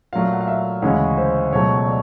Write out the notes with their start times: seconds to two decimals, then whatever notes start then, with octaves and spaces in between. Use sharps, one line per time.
0.13 A#2 F#3 A3 F5
0.33 F#5
0.41 F5
0.48 E5
0.82 D2 C#3 E3 G#3 C#5
1.18 C5
1.52 C#2 B2 F#3 A3 C#5
1.87 D5